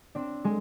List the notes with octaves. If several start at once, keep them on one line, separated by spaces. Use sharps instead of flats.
C4 D4
G#3